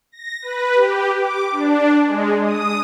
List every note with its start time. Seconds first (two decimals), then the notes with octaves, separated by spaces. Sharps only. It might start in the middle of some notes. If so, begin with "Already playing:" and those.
0.12 A#6
0.42 B4
0.75 G4
1.18 D6
1.52 D4
2.06 G#3
2.43 D#6